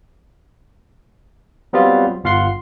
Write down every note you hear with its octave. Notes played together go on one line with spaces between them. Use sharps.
F#3 G3 B3 C4 F4
G1 F4 F5 F#5 C6 C7